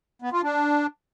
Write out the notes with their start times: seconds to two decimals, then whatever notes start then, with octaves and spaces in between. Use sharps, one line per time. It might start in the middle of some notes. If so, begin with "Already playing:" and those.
0.22 B3
0.33 F4
0.43 D4